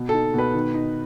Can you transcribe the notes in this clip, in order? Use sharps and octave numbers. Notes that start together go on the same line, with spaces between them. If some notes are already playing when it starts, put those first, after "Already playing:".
Already playing: B2
D#4 A4
B2 B4
D#3
D#4